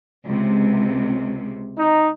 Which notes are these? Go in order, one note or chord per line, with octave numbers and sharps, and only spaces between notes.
C#2 C3
D#4